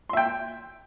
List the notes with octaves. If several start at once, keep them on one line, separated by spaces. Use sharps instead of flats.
E5 G5 C6